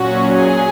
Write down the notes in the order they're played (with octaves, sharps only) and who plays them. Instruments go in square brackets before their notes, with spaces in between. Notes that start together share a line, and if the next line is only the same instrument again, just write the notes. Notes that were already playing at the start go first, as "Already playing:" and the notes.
Already playing: [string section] A#2 F#3 C#4 F#4
G#4